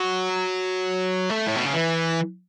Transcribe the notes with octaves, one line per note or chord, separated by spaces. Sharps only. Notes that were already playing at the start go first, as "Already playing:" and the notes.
Already playing: F#3
A3
A2
B2
C#3
E3